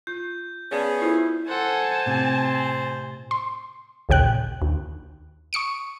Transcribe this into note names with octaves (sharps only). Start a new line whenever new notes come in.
F4 G6
B3 C#4 G#4 D5 F5 A5
E4 F4 A4 C5
A4 C5 F#5 G#5 A5
A2 C3 C4
C6
A#1 D#2 C#3 G5 F#6
D#2
C#6 D#6 C#7 D7